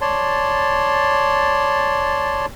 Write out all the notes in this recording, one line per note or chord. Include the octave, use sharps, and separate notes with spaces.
C#5 D5 A5 C6